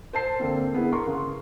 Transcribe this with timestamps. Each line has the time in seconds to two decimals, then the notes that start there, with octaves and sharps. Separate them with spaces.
0.13 C5 A5 C7
0.39 D3 A#3 C4
0.73 G#3 B3 E4 G#4
0.92 A#4 C6 C#6
1.07 C#3